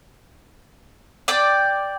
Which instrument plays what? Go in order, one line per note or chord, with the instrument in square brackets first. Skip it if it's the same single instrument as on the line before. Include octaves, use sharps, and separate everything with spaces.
[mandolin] D5 G5